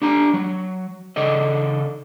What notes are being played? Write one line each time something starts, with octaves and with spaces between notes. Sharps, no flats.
D4 G4 A#5
F#3
C#3 A4 D5 D#5